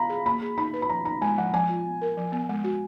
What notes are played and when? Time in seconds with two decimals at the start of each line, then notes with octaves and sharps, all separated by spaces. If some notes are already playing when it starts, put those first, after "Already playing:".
Already playing: F5 A#5 B5
0.09 G#4
0.26 A#3 B5
0.42 G#4
0.57 D#4 B5
0.73 B4
0.82 B5
0.89 F3 A#5
1.05 D#4 A#5
1.22 G#3 G#5
1.38 F3 F#5
1.54 F3 G#5
1.69 F4
1.85 B3
2.01 A#4
2.17 F3
2.32 B3
2.49 G#3
2.64 F#4